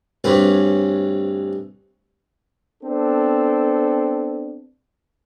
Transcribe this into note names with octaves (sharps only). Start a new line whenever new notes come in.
D2 G2 C4 C#4 B4
B3 C4 D4 A4